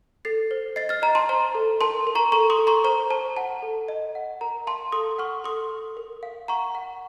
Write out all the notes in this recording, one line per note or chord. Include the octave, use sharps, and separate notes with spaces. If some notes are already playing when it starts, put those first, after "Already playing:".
A4 A6 C7
C5
D#5 A6 C7
F6 A6
D#5 A#5
A5 C6
C5 A#5
A4
A#4 A5 C6
A#4
A#5 C#6
A4 A#5 C#6
C6 D#6
A4
A#5 C#6
C5 A#5
C5 A5
F#5 A5
A4
D#5
F#5
A#4 A#5
F5 A5 C6
A4 C6 D#6
F#5 C#6 F6
A4 C6 D#6
A4
A#4
F5
F#5 A#5 C#6
F#5